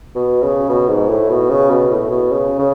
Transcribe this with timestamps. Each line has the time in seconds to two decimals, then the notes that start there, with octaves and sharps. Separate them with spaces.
0.15 B2
0.42 C#3
0.69 B2
0.89 G#2
1.09 A2
1.30 B2
1.50 C#3
1.70 B2
1.91 A2
2.10 B2
2.31 C#3
2.59 C#3